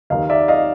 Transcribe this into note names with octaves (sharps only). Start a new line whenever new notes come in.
D#2 D#3 D#5 F5
D5 E5
D#5 F5